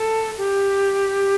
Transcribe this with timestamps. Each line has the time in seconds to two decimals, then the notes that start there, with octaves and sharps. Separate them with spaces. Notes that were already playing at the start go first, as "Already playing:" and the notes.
Already playing: A4
0.38 G4